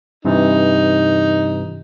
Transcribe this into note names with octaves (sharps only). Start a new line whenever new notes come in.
G2 C3 E3 D#4